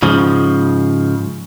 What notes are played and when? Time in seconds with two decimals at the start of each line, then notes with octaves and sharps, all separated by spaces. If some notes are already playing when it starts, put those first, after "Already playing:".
0.02 G#2 C#3 F3